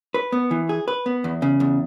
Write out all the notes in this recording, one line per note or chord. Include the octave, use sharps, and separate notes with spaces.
B4
B3
E3
G#4
B4
B3
E2
C#3
E2